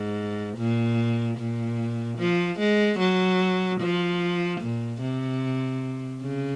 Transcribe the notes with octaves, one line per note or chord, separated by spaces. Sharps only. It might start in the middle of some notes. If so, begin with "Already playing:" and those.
Already playing: G#2
A#2
A#2
F3
G#3
F#3
F3
A#2
C3
C#3